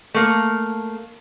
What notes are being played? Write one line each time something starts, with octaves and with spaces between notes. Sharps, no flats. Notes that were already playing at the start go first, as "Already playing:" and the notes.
A3 A#3